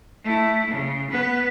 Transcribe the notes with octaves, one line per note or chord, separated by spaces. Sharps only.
A3 E4
C#3
B3 B4